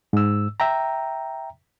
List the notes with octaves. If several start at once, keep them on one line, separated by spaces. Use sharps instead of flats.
G#2 E6
E5 G5 A#5